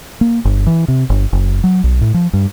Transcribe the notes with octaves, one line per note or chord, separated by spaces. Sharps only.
A#3
G1
E3
C3
G1
F#1
F#3
B1
A2
F3
G2